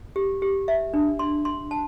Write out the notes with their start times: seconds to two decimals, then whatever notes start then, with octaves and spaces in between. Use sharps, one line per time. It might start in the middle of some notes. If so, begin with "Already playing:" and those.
0.16 G4
0.42 G4
0.68 E5
0.94 D4
1.19 C6
1.45 C6
1.71 A5